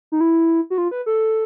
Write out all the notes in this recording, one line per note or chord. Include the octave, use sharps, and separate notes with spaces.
D#4
E4
F#4
F4
B4
A4